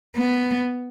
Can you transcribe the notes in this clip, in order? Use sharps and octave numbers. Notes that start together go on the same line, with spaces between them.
B3